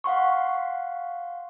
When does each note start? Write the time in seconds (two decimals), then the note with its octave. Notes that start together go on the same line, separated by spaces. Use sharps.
0.04 F5 F#5 C6 C#6